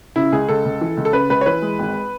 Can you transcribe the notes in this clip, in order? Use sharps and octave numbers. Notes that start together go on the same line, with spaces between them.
C#3 E4
C#2 G#4
C#2 A4
C#2
E3
C#2
A4
C#3 B4
C#2 B4
C#5
E3 B4
G#3
G#1